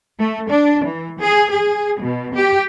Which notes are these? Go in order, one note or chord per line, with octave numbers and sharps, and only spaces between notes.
A3
D4
E3
G#4
G#4
B2
G4